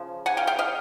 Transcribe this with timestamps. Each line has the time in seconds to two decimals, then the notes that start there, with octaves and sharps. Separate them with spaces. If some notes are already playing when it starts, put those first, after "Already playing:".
Already playing: C#3 F3
0.26 F#5 G#5
0.37 F5 G5
0.47 F5 G5
0.59 D#5 F5